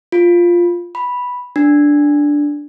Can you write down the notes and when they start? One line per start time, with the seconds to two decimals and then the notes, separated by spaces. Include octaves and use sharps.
0.12 F4
0.95 B5
1.56 D4